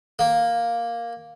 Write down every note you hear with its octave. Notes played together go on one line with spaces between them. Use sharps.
A#3